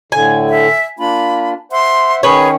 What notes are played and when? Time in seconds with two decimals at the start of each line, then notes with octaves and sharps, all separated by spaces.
0.12 A2 D3 G#5
0.49 E5
0.99 A#3 D4 F4 B5
1.72 C5 E5 F#5 C6
2.23 D#3 C#4 G#4 B4 C#5